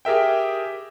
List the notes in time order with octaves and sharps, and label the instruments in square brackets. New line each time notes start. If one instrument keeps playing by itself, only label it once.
[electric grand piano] G4 G#4 A#4 E5 G5